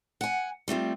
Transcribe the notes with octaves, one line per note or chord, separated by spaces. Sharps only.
F#5 G#5
G3 A3 C4 F4